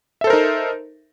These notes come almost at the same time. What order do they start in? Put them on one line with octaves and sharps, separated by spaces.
E5 A4 C5 A#4 D#4